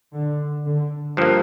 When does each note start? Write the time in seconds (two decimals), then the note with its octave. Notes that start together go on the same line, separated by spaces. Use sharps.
0.13 D3
0.65 D3
1.17 G2 F3 A#3